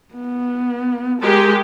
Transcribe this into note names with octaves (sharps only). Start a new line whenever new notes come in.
B3
G#3 G4 A#4